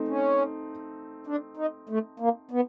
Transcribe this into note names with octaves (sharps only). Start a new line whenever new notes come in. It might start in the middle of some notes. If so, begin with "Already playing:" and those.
Already playing: A3 C4 D#4
C#4
D4
D#4
A3
A#3
B3